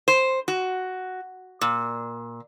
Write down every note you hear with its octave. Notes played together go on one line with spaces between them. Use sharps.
C5
F#4
A#2